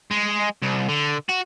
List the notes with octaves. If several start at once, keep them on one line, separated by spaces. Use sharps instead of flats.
G#3
C2
D3
F#4